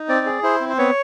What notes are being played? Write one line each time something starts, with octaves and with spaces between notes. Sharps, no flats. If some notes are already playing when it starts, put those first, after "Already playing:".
Already playing: D#4
C4 D5
G#4
E4 C5
C4
C5
B3 C#5